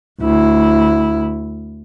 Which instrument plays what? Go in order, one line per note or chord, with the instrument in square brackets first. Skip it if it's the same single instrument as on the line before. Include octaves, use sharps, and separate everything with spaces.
[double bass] D2 E4